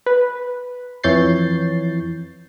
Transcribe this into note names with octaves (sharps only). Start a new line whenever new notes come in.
B4
F2 E3 C#5 G6 A6 C7